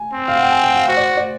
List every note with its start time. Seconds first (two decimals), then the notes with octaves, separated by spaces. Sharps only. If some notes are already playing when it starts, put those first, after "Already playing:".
Already playing: G#5
0.13 C4
0.28 F5
0.36 F#5
0.43 G5
0.51 G#5
0.63 G5
0.70 F#5
0.76 F5
0.88 F#4 C5
0.97 D5
1.17 D5